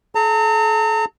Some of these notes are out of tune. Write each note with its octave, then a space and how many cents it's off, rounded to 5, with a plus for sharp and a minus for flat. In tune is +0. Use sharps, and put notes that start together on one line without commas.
A4 -40 A#5 -40